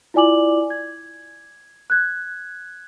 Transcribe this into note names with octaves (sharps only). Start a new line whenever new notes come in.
E4 F4 D5 G#5 D6 F#7
G#6
F#6 G#6